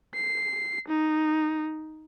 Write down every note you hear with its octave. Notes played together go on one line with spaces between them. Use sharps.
C7
D#4